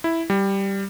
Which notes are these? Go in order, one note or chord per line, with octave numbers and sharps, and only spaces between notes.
E4
G3